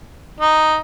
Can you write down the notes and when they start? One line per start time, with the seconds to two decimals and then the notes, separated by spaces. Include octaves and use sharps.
0.40 D#4